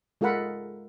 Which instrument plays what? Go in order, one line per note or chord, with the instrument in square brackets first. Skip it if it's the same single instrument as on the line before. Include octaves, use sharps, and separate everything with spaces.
[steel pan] G#3 F4 A4 A#4 F#5 B5